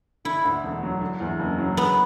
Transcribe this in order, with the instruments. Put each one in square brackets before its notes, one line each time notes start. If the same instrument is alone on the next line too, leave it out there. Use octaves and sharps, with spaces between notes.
[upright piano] D3 [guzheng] E4
[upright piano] D2
E1
F#3
D3
E2
F#1
F#3
[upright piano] G#3 [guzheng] B3